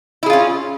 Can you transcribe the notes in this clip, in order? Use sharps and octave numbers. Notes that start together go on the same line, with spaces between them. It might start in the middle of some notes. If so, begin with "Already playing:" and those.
C#4 E4 F4 G#4